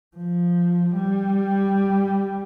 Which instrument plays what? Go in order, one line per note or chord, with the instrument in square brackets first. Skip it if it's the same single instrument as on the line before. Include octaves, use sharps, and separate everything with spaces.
[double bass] F3
G3